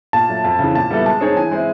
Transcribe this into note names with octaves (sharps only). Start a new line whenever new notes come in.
A#2 A5
F#3 A3
F2
C#3 E3
A#2 A5
G3 B3 E4 A4
G#3 A5
C4 D#4 G#4 C#5
E3 G#5
G#3 C4 E4